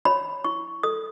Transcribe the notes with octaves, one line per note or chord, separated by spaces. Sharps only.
C#5 B5
E4 C#6
A4 D#6